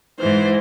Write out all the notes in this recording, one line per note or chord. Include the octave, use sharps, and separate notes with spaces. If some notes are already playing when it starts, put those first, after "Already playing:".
E3 C5
G#2